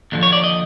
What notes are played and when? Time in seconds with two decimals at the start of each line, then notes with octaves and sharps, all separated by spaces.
0.12 D#2 D3 F3
0.23 C#5
0.33 D5
0.44 D#5